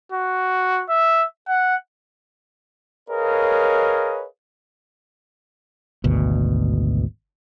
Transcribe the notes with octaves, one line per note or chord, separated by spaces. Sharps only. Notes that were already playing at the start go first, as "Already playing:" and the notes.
F#4
E5
F#5
G#4 A#4 B4 C#5 D#5 F5
G#1 D2 B2